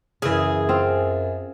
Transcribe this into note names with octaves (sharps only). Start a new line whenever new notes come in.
F#2 C#3 E3 G#4
C4 F4